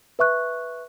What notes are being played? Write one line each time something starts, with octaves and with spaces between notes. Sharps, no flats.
B4 E5 C#6 F#6